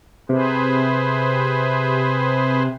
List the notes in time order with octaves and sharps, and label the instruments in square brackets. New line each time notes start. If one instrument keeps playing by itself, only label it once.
[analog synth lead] C3 [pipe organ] G#4 B4 C5